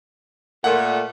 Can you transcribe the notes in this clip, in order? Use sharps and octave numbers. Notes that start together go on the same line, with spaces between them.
A#2 A3 F#5